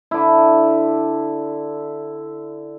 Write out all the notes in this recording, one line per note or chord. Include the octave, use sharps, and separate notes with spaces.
D3 E4